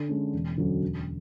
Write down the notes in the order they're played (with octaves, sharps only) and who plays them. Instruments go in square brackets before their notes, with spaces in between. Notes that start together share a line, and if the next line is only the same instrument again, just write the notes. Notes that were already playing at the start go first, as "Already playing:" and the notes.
Already playing: [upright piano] D3
G#3 C#4
E1
D2 D3 F#3 C#4
E1